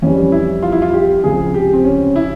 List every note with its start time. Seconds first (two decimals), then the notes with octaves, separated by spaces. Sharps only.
0.02 F2 E3 G3 C#4
0.32 E4
0.62 F4
0.72 E4
0.82 F4
0.93 G4
1.24 C#2 C3 F3 G#3 G#4
1.54 G4
1.73 C4
1.85 C#4
2.16 E4